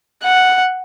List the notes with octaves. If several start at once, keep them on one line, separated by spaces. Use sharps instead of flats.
F#5